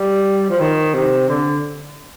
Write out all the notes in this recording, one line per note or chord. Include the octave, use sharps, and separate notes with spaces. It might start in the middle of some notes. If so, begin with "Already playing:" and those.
Already playing: G3
F3
D#3
C3
D3